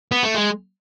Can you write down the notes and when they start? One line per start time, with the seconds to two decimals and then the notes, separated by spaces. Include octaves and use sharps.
0.11 B3
0.23 A3
0.35 G#3